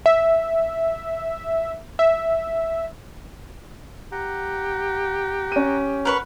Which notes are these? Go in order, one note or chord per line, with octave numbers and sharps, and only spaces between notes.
E5
E5
G4 F#5 A#5
C#4 D#7
A#4 B4 F#5 C#6